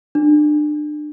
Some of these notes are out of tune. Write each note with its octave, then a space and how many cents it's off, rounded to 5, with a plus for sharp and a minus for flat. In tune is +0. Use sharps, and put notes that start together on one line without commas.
D4 +30